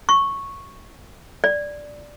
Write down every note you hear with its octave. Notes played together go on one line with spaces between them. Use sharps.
C#6
D5